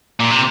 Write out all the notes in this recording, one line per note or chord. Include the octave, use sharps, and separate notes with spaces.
A#2
C3